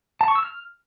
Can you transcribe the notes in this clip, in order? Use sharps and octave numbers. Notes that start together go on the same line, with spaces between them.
A5
C#6
E6
F6